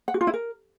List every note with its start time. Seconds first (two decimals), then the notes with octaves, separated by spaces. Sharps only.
0.08 F#5
0.14 F#4
0.21 F4
0.27 E4
0.34 A#4